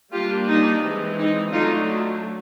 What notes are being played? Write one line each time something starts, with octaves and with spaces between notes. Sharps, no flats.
G3 A#3 D4 F4 G4
D#4
E3 G#3 C4
D#4
D3 F#3 A3 D#4 F4